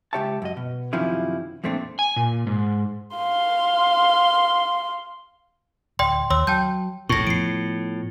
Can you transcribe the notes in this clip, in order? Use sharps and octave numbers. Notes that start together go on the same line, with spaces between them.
C#2 D3 G4 C#5 E5 A5
F#2 D#5
B2
F#2 C3 D#3 F3 C#4 E4
F2 A#2 A3 C4 D4
G#5
A#2
G#2
F5 C6
D1 D5 G5 C6
D#2 C#5 C6 E6
F#3 G5 A5 G6
F1 A#1 F2 A2 C#6 A#6
F3 B3 C7 D7